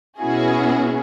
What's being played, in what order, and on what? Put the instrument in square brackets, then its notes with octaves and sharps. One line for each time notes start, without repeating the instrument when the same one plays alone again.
[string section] B2 B3 C#4 E4 F#4 G#4